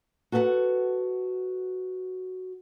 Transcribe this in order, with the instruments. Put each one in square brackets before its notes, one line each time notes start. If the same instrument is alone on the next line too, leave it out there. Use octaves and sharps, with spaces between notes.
[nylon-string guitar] F#4 A4 B4 E5 F#5